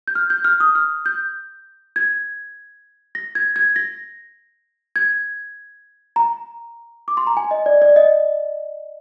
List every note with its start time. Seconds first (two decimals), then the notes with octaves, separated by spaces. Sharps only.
0.07 G6
0.15 F6
0.30 G6
0.45 F6
0.60 D#6
0.75 F6
1.06 G6
1.96 G#6
3.15 A#6
3.35 G#6
3.56 G#6
3.76 A#6
4.96 G#6
6.16 A#5
7.08 D6
7.17 C6
7.27 A#5
7.37 G#5
7.51 D#5
7.66 D5
7.82 D5
7.96 D#5